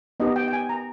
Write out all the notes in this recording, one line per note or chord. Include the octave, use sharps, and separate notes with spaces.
B3 D#4 G4 D#5
G5
G5
G#5
A#5